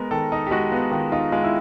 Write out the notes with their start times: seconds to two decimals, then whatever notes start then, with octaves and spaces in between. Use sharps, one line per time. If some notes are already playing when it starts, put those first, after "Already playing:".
Already playing: G#3 B3 A#4
0.11 D#3 A4
0.32 D#4
0.47 G4
0.51 G#3 F#4
0.71 B3 F4
0.91 D#3 F4
1.12 D#4 F4
1.32 G#3 F4
1.44 E4